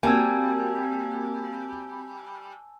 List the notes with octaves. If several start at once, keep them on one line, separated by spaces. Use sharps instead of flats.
G3 A#3 C4 F#4 G#5 A5 E6 G#6